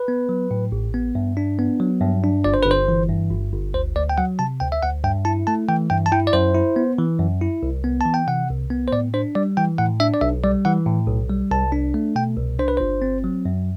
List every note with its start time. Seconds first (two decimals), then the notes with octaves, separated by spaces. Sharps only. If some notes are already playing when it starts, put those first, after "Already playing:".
Already playing: B4
0.08 B3
0.29 F#3
0.51 A2
0.72 A1
0.94 B3
1.15 G2
1.37 D4
1.59 B3
1.80 F#3
2.01 G2
2.24 D4
2.44 G1 D5
2.54 C5
2.63 B4
2.66 G1 C5
2.88 E3
3.10 G2
3.31 G1
3.52 G1
3.74 D2 C5
3.96 D2 D5
4.09 G5
4.18 F#3 F#5
4.39 C3 A5
4.60 D2 G5
4.72 E5
4.83 D2 F#5
5.04 G2 G5
5.25 E4 A5
5.47 A3 A5
5.69 E3 G5
5.90 G2 G5
6.06 A5
6.12 E4 G5
6.27 D5
6.33 F#2 C5
6.54 E4
6.76 B3
6.98 E3
7.19 F#2
7.41 E4
7.63 C2
7.84 B3
8.01 E3 A5
8.14 G5
8.28 C3 F#5
8.49 C2
8.70 B3
8.88 C5
8.92 A2 D5
9.14 D4 C5
9.35 G3 D5
9.57 E3 G5
9.78 A2 F#5
10.00 D4 E5
10.14 D5
10.21 B1 E5
10.44 G3 D5
10.65 E3 F#5
10.86 A2
11.07 B1
11.30 G3
11.51 C2 A5
11.72 D4
11.94 A3
12.16 B2 G5
12.37 C2
12.59 D4 C5
12.68 B4
12.77 G1 C5
13.02 C4
13.24 F#3
13.46 F#2